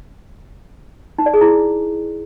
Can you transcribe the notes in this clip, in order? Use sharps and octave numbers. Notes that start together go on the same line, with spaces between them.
D#4
D5
G#4
E4